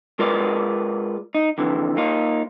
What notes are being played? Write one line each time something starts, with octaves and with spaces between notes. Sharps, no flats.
G#3 F4 A#4 B4 D5
D#4
F2 D3 E3
A#3 D#4 F4